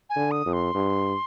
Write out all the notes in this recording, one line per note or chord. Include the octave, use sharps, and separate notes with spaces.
G#5
D3
D#6
F2
C6
G2